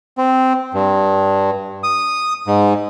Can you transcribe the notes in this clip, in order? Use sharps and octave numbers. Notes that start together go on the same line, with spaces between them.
C4
G2
D#6
G#2